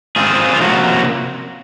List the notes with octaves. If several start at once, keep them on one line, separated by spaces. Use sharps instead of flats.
G#2 D#3 G#3 C4 F4 G#4
F4
C3 F3 A#3 C#4 D#4 F#4